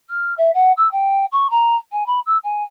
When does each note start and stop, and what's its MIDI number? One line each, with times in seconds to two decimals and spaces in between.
0.10 0.33 89
0.37 0.51 76
0.54 0.72 78
0.77 0.90 88
0.91 1.25 79
1.32 1.47 85
1.50 1.76 82
1.92 2.06 80
2.06 2.20 83
2.26 2.37 88
2.44 2.63 80